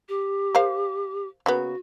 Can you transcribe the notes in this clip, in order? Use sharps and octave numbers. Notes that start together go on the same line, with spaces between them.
G4
A#4 C5 F5
C#3 A#3 B3 F#4